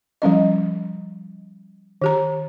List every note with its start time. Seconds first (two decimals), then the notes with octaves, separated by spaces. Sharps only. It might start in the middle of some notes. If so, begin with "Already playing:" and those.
0.22 F3 G3 C#4 D#5
2.02 D#3 G4 A#5